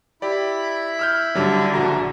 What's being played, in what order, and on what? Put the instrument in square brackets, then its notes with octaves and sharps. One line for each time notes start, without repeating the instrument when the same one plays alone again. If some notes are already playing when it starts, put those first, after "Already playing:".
[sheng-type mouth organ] E4 B5 [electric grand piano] G4 D5
[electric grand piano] E6 F6 G6
[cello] D3 [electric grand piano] F#3 G3
[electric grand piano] A#1 F#4 A#5 [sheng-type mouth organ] E4